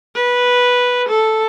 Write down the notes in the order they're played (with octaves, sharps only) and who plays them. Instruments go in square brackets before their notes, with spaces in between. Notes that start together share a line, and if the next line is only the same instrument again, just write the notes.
[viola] B4
A4